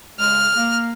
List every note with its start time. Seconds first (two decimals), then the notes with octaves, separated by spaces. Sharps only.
0.19 C#3 G#3 F6
0.55 A#3